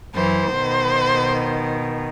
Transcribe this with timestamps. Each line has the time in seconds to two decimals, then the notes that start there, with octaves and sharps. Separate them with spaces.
0.15 F#2 E3 C5
0.51 B2 D#3